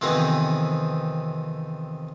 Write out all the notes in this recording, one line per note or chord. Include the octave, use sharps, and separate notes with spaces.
F2 C3 D#3 E3 B3 D#4